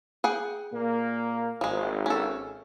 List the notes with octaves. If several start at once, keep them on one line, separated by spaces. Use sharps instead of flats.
G#4 F#5 G5
A#2 A#3
G#1 F3 G#3
C#4 A4